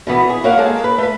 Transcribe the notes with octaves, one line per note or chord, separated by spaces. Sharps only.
B2 E3 B3
G#4
A#3 C#5 F5 F#5
G#3 A#3 G#4 A4
B4
A3 B4